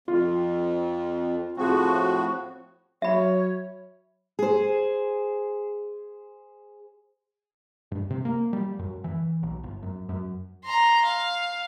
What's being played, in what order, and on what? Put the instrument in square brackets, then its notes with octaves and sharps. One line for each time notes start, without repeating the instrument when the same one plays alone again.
[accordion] F2 [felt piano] F4
[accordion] A2 F3 F#4 [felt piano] C4 G#4
[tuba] F#3 [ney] C#5 [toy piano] E5 B5
[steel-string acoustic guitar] G#4 C5
[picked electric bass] G2
C3
A#3
G3
F#2
E3
B1
G1
F#2
F#2
[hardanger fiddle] A#5 C6
F5